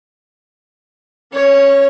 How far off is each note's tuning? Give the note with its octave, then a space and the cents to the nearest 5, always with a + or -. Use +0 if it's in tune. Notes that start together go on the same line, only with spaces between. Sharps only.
C#4 -20 C#5 +0